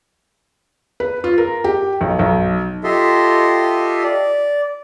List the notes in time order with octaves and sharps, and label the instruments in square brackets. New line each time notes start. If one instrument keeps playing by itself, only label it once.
[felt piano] B4
F4
A#4
G4
B1
B1
[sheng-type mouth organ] F4 G4 A4 D#5 E5 C6
D5